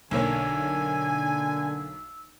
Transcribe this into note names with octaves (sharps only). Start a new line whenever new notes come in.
B1 D3 A#3 C#5 G#5 E6